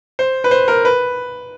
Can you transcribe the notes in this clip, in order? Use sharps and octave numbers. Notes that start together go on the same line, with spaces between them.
C5
B4
C5
A#4
B4